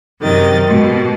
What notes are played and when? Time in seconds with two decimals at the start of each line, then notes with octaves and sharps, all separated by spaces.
0.21 F#2 C3 D#3 D#5 A6
0.65 G#2 B2